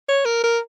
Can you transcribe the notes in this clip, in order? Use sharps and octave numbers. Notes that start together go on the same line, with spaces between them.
C#5
A#4
A#4